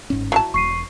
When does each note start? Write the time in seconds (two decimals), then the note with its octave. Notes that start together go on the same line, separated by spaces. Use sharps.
0.10 G1 G#2 C#4
0.32 F#3 E4 A5
0.54 E1 C#6 C7 D#7